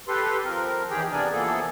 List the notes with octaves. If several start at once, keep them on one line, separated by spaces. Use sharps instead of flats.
G4 A4 B4 C6
F3 C4 A#4
E2 D#3 E3 G4 G#4 G5
C3 B3 D4 A#4 D5 G#5
E3 F3 A#3 B3 G#4 A4